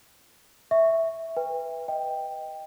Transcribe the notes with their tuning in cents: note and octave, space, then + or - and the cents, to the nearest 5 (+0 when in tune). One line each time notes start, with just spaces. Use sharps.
E5 -5 C#6 +0
B4 +0 G5 +40
D#5 +5 G5 +5